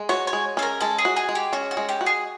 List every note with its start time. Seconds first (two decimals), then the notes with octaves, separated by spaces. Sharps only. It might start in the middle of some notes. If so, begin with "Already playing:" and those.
Already playing: G#3
0.09 F#4 C#5
0.27 C#5
0.33 G#3
0.57 C#4 A4
0.62 A#4
0.81 G#3 A4
0.98 G#4
1.05 F#4
1.16 G#4
1.29 G#3
1.35 G4
1.53 C#4 F#4
1.71 F#4
1.77 G#3
1.89 G4
2.01 F#4
2.06 G#4